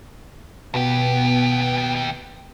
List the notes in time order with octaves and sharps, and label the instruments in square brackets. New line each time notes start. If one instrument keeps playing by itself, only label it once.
[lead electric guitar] D#2 G4 [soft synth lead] B2 [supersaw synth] B3